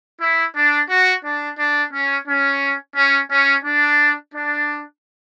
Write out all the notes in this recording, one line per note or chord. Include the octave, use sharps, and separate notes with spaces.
E4
D4
F#4
D4
D4
C#4
C#4
C#4
C#4
D4
D4